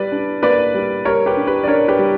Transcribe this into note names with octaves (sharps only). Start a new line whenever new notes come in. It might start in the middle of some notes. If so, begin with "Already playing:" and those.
Already playing: G3 B4 D5
D4
A#3 B4 D5
G3
G3 A#4 C#5
G4 B4
D4
G4 B4
D5
D4 A#4 C#5
G4 B4
G3